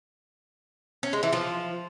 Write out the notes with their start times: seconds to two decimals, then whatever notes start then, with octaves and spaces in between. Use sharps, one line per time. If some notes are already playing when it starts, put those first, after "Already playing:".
1.03 C#4
1.13 G#3
1.23 E3
1.33 F3